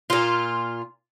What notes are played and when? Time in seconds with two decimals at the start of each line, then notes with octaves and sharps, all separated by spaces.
0.10 A#2 F4